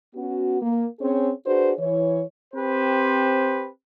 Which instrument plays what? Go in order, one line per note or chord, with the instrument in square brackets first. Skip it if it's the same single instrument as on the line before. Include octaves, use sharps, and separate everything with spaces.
[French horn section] B3 C#4 F#4
A#3
C4 C#4 G#4 C5 C#5
D4 F#4 G#4 B4 C5
E3 C#5
[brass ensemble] C4 G4 B4 C5